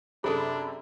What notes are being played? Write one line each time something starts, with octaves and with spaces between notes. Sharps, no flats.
F#2 C3 D4 G#4 A4 B5